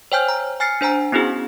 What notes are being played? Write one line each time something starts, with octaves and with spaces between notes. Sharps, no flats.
C5 C#5 G5 G#5 F6 G6
A#5
G#5 F6 A6 C7 C#7
D4 C5 G#5 A#5
B3 C#4 E4 F#4 G#4